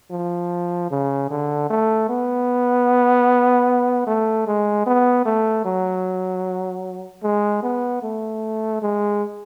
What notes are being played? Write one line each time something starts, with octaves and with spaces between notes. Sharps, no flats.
F3
C#3
D3
A3
B3
A3
G#3
B3
A3
F#3
G#3
B3
A3
G#3